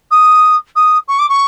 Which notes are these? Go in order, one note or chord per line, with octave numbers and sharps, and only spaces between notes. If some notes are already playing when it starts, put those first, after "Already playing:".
D#6
D#6
C#6
D6
C#6